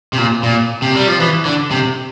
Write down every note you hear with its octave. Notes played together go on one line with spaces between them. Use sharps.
C3
A#2
A#2
C3
G3
F3
E3
D3
C3